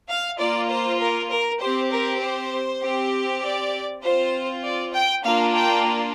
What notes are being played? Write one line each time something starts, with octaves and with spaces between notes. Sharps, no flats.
F5
A#3 F4 D5
C5
A#4
A#4
C4 G4 C5
A#4
C5
C4 G4
D5
C4 F4 C5
D5
G5
A#3 D4 F4 F5
G5